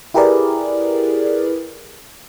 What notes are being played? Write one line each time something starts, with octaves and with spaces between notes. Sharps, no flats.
E4 G4 G#4 A#4 B4 D5